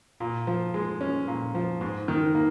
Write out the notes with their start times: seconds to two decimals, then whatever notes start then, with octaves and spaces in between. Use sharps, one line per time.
0.20 A#2
0.47 F3
0.74 G#3
1.01 C#4
1.28 A#2
1.55 F3
1.81 G#2
2.08 D#3
2.35 A#3